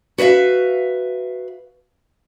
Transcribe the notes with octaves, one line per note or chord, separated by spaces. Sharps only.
F#4 B4 C#5 E5 F5